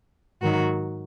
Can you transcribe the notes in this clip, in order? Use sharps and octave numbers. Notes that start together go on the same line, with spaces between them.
G#2 D#3 F#3 F#4 A#4